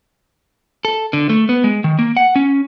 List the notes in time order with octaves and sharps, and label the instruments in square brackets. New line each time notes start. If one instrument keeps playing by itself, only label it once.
[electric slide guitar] A4
D3
A3
B3
G#3
D#3
A#3
F#5
C#4